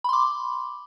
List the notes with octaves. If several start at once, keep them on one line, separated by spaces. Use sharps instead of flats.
B5 C6 D6